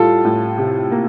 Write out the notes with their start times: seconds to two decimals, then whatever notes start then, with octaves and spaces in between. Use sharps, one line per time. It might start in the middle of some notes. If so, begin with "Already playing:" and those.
Already playing: A2 G3 F4 A4
0.25 A2
0.58 C3
0.92 A#3